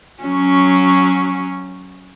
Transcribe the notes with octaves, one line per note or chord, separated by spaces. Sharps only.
F#3 C#4